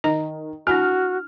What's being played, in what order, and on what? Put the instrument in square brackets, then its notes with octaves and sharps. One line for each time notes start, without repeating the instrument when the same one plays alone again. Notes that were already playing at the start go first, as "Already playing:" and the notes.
[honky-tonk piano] D#3 [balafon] D#5 A#5
[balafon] D4 E4 G#5 [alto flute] F#4 [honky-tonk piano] F6